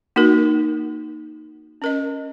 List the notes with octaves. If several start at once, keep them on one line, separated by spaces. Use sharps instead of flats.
A#3 D#4 F#4 A#4
C#4 A#4 D#5